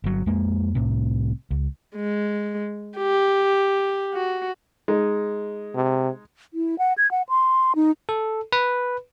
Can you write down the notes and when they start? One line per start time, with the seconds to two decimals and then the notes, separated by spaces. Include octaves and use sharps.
0.04 G1 F#3
0.26 F2 G#3 A#3
0.75 C2 A2 C3
1.51 C#2
1.96 G#3
2.97 G4
4.14 F#4
4.88 G#3 D#4
5.75 C3
6.54 E4
6.79 F#5
6.98 G#6
7.11 F#5
7.29 C6
7.75 D#4
8.09 A4
8.52 B4